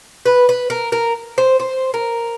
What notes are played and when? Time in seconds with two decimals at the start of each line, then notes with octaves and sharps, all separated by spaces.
0.26 B4
0.49 B4
0.70 A#4
0.92 A#4
1.38 C5
1.60 C5
1.94 A#4